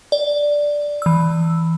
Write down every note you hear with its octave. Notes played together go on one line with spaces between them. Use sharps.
D5
E3 E6